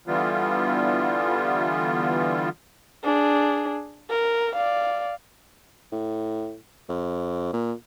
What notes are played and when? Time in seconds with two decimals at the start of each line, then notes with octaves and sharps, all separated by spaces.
0.07 D3 E3 G3 B3 F4
3.04 D4 G#4
4.10 A#4
4.55 D5 F5
5.92 A2
6.89 F2
7.53 A#2